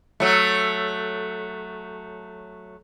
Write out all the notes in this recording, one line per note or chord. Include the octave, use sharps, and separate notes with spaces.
F#3 A3